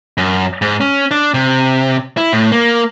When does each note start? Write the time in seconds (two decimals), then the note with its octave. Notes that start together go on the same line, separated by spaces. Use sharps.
0.18 F#2
0.62 G#2
0.81 C#4
1.11 D4
1.34 C3
2.17 E4
2.33 A2
2.52 A#3